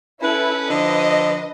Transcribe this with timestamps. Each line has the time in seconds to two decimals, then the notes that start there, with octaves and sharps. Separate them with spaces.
0.22 C#4 E4 A4 B4
0.70 D3 F3 B4 D#5